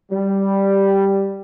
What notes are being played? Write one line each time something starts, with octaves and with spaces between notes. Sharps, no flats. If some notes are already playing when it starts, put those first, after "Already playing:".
G3